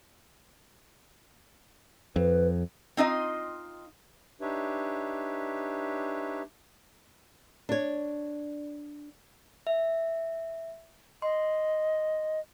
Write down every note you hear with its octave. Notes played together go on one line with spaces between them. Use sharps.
F2 B4
C4 D#4 F4 D#5
D4 D#4 G4 B4 C#5 E5
D4 C#5
E5
D#5 C6